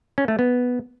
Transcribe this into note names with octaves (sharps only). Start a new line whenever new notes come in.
C#4
A3
B3